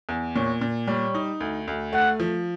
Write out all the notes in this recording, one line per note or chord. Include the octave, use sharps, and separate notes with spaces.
E2
A#2 C#5
A#2
G3 C#5
D#4
D2
D2
A3 F#5
F3